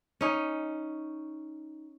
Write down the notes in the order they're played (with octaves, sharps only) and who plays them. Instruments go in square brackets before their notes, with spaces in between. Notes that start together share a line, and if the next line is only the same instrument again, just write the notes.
[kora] C#4 D#4